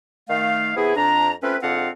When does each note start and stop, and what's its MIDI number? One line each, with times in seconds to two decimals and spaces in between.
0.29 0.72 51
0.29 0.72 57
0.29 0.72 77
0.76 0.94 48
0.76 0.94 52
0.76 0.94 59
0.76 0.94 64
0.76 0.94 68
0.96 1.32 41
0.96 1.32 62
0.96 1.32 82
1.42 1.56 57
1.42 1.56 60
1.42 1.56 61
1.42 1.56 65
1.42 1.56 71
1.62 1.89 44
1.62 1.89 50
1.62 1.89 60
1.62 1.89 65
1.62 1.89 77
1.62 1.89 78